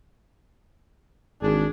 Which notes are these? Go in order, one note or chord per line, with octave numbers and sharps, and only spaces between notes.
G#1 D4 G#4